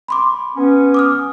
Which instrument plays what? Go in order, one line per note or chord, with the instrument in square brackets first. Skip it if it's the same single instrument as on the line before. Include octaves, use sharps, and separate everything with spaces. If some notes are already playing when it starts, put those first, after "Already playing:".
[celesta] B5 C6 D6
[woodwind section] B3 C#4
[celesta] D6 D#6 F6